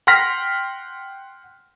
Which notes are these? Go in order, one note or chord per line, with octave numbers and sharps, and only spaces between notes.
F#5 G5 C6 F6 A#6 B6